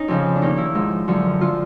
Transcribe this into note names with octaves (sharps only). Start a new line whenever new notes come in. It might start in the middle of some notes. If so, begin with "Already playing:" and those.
Already playing: C#4 D#4
F2 C#3 F3
D4
D#2 D#3 D#4
E4
G#2 F3
F#2 D3 F3
D3 F3 F4